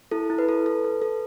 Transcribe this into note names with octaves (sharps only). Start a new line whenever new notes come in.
E4 A4
E4
B4
A4
A4
A4
A4